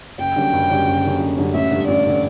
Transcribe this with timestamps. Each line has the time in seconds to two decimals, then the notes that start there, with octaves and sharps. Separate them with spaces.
0.18 F#1 G5
0.36 F#2 D3 G3
0.53 F#1
0.70 F#2 D3 G3
0.86 F#1
1.03 F#2 D3 G3
1.20 F#1
1.37 F#2 D3 G3
1.54 A1 E5
1.71 G2 D3
1.87 A1 D5
2.07 D3